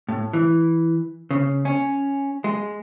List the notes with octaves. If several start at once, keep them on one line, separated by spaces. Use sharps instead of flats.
A2
E3
C#3
C#4
G#3